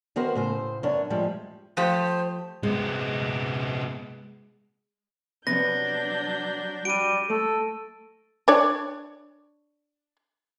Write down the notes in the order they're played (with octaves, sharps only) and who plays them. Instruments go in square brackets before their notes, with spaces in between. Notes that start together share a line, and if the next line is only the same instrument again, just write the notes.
[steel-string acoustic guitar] D#3 B3 F#4 A#4 C5
A2 C#3 C5
F#2 B3 D4 C#5
A2 F3 G3 G#3
[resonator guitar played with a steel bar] F3 A3 G4 [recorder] C5
[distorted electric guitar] C3 B3 [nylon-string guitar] G#3
[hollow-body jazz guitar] C3 B3 B4 [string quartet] F#3 D4 G6 [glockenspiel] A#6
[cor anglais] G3 [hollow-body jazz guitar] F#4 [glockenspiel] D7 D#7
[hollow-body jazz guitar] A3 [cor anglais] A4
[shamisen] D4 C#5 D5